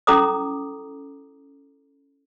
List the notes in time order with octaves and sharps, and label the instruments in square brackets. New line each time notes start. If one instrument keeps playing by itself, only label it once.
[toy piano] C#4 E4 A4 A#5 D6 D#6